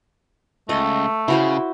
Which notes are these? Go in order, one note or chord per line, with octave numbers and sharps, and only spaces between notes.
C#2 A3 D#5
C#3 E4 F#4 C5